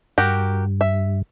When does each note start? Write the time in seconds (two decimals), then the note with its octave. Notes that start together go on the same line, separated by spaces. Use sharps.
0.18 G2 F#4 G4 A#4
0.81 E5